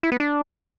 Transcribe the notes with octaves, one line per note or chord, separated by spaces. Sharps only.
E4
B3
D4